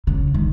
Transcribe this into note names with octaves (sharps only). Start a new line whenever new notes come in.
C#3
D#3